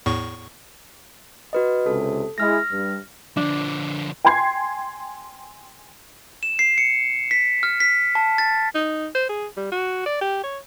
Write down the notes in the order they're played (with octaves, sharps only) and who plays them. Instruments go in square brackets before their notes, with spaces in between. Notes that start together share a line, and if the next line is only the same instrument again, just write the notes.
[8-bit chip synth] E2 A2 C#6
[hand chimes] F#4 B4 D#5
[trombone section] C#2 C3 [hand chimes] A4
[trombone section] G#3 E4 [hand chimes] F6 A#6
[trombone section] G2
[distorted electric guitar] D3 F3 [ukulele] D4
[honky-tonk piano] G5 G#5 C6 G#6 C7
[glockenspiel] E7
C7
C#7
B6
F6
B6
A5
A6
[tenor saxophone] D#4
C5
G#4
G3
F#4
D5
G4
C#5